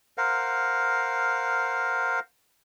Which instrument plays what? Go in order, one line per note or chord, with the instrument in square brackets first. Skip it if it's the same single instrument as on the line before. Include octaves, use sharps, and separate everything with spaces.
[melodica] A#4 C5 F5 F#5